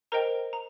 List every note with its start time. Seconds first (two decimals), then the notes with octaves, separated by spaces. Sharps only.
0.12 A#4 C5 D#5 G5 A#5
0.53 A#5